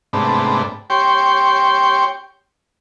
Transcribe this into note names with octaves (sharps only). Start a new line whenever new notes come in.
G#2 C3 A3 B3 D4
G4 C#5 G5 C6